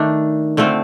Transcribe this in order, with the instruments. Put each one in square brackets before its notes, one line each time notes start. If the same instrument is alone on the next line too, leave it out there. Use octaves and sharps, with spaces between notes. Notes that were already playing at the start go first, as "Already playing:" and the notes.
Already playing: [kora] D#3 A3 D4
D3 A3 C4 F4